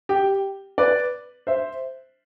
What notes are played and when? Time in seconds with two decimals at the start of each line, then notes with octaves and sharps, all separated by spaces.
0.09 G4
0.78 B4 D5
1.47 C5 E5